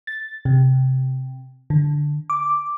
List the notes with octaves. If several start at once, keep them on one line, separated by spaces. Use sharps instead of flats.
A6
C3
D3
D6